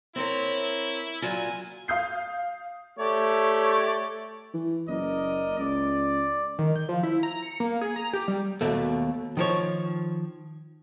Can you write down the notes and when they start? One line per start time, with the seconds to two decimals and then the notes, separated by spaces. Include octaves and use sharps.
0.16 C4 E4 A#4 C#5
1.22 A#2 F#3 F4 G#5
1.88 F5 D#6 G6 C7
2.99 A3 G4 C#5 D5
4.54 E3
4.87 F#1 A#4 D5 D#5
5.58 C#2 D5
6.59 D#3
6.76 G6
6.89 F3
7.03 E4
7.23 A#5
7.43 C#7
7.60 A#3
7.81 G#4
7.96 A#5
8.13 G4
8.28 G3
8.61 D#2 B2 A3
9.37 D#3 F3 C#5